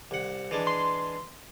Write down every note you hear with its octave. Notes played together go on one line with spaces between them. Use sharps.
C2 F#5
E3 G#3 D4
C6